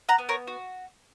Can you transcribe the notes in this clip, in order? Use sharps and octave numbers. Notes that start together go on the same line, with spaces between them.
F#5 A#5
B3
A#4 C#5
F#4